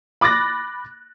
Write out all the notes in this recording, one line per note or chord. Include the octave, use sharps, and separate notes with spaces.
B5 D6 F#6 A6 A#6